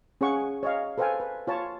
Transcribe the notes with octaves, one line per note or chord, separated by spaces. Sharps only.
C#4 G#4 C#5 F5 F#5 C#6
C#5 D#5 F5
A4 B4 C5 F5 G5 G#5
B4
F4 C#5 A5 B5